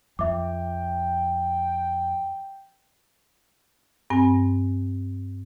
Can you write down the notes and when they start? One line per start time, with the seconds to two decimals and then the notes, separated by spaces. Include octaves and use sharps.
0.19 F2 E5 G5 D6
4.10 G2 C4 G#5